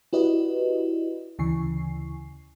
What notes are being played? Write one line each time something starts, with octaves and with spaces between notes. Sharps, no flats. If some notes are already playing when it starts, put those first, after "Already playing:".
E4 F#4 G4 B4 D5 D#5
D2 C#3 E3 G#5 C#6 C7